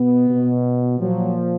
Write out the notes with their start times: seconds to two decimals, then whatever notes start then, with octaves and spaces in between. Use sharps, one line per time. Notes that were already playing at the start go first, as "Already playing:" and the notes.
Already playing: B2 B3
0.29 B2
1.00 A#2 F3 F#3